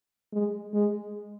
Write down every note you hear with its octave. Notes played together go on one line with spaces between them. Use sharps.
G#3
G#3